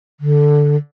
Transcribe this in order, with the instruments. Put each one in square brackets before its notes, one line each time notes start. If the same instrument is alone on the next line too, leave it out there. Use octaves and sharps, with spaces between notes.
[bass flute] D3